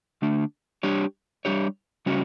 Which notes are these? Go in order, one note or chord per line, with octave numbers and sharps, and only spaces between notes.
D3 A3 D4
G3 D4 G4 C#5
G3 D4 G4 C#5
C#3 G3 C#4 F#4 C#5